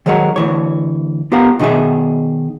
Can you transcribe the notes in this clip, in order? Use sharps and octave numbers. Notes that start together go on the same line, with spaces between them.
D#3 F#3 G#3 A#4 F#5
D2 E3 C#5
B3 F4 G4 A#4 F5 F#5
B2 D#3 D#4 G#4 E5